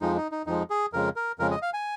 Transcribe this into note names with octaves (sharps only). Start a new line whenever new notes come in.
F2 F3 G#3 D#4
D#4
D#4
F2 F3 G#3 D#4
G#4
F2 C#3 G#3 A#4
A#4
F2 C#3 G#3 A#4
D#5
F5
G#5